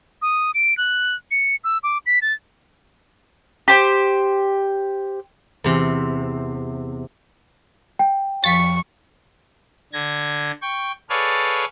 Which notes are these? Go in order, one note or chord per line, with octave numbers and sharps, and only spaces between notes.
D#6
D7
F#6
C#7
E6
D6
B6
A6
G4 C5
E2 C3
G5
F2 F3 C#6 A6 B6
D3 G#6 A#6
G5 C#6
G#4 A4 B4 C#5 D5 F5